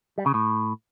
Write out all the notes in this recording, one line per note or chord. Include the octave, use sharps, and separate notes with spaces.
G3
C#3
A2